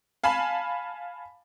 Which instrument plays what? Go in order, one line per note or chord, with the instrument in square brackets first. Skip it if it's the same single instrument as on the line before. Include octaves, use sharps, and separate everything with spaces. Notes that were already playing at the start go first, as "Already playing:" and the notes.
[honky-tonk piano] F5 G#5 A5 B5